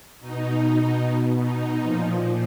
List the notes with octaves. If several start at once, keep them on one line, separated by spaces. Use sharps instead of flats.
B2 D#4
D#4
A#2 F3